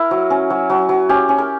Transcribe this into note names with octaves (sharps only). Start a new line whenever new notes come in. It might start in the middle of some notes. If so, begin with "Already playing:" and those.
Already playing: E4 A#4
F#3
C#4
F#3
F#3
F#3
C#4 G4
C#4
A#4